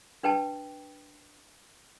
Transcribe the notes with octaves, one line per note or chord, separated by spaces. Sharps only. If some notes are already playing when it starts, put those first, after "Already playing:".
D4 B4 G5 A5